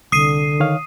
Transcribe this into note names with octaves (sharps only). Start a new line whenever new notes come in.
C2 D3 D#6 C7 D#7
D#3 C#5 F5